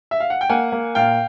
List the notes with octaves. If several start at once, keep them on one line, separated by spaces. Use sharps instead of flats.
E5
F5
F#5
G5
A#3 F#5 G#5
A#3
A#2 F5 G5